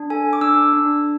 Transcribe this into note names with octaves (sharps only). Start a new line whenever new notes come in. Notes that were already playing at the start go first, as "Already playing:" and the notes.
Already playing: D4
A4 G#5
D6
D4 E6
D4